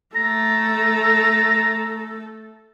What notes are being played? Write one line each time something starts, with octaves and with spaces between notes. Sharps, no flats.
A3 A4 A#5